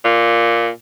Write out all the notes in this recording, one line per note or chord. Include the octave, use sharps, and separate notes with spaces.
A#2